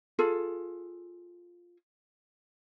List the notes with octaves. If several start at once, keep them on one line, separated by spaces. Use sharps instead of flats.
F4 G#4 A4